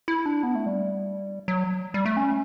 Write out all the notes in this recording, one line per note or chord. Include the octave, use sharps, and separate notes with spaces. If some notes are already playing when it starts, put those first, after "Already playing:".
E4
D4
B3
A3
G3
F#3
G3
A3
C#4